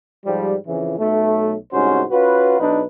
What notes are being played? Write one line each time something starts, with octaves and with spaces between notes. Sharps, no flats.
G#2 F3 G3
F2 C#3 E3
B1 A3
C2 G#2 C#4 F#4 C5
C#4 F4 F#4 B4
B1 D4 D#4 B4